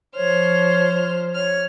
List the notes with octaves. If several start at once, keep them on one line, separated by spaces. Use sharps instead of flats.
F3 C5 C#5 F6
C#5 F6